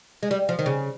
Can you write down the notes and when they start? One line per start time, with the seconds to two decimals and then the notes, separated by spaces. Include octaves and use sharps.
0.23 G#3
0.31 G3
0.49 F3
0.59 D#3
0.66 C#3